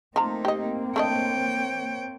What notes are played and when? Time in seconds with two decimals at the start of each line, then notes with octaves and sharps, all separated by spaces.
0.16 F3 A3 A#3 C4 D#4 A#5
0.45 G4 D#5
0.96 A3 D4 C#5 D#5 G5